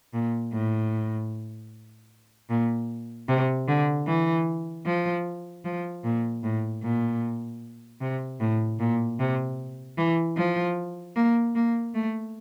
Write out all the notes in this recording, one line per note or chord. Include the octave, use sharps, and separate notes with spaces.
A#2
A2
A#2
C3
D3
E3
F3
F3
A#2
A2
A#2
C3
A2
A#2
C3
E3
F3
A#3
A#3
A3